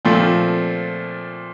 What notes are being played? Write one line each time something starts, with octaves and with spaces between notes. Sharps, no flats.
A#2 F3 A3 C4 F4